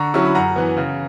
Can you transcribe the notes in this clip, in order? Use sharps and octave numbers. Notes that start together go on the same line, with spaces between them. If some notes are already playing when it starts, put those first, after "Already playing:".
Already playing: D3 A#5 C#6
F#3 C#4 E4 C#6
B5
F#2 F#5 A#5
E3 B3
C#3